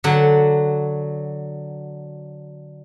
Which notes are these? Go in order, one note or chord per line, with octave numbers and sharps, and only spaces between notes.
D3 F#3 F#5